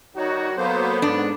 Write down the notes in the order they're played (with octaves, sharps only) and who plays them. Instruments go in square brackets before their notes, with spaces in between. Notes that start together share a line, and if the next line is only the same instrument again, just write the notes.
[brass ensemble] D#3 G3 F#4 [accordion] D#4 [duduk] C#5
[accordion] F#3 A#3 C5 [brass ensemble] B3 [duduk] A4
[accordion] G#2 [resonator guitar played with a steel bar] D4